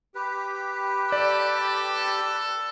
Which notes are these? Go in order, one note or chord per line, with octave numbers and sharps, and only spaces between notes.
G4 B4
A4 D5